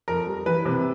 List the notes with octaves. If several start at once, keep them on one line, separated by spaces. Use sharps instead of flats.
F2 A#4
G3
E3 B4
C3